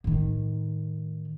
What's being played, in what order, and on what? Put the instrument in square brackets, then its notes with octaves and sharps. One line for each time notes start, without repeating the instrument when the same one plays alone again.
[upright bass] A2 D#3